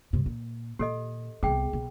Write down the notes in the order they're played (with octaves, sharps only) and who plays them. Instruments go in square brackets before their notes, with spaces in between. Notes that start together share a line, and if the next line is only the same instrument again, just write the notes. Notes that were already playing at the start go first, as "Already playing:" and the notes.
[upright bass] G2 C3
A#2
[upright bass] A#2 D#3 [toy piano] G4 A4 D#5
[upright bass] C2 B3 [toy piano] G#4 G5
[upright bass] B1